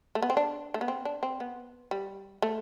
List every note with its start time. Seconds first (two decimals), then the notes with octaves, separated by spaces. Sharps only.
0.15 A3
0.22 B3
0.30 C4
0.37 D4
0.74 A3
0.81 B3
0.88 C4
1.05 D4
1.23 C4
1.40 B3
1.91 G3
2.42 A3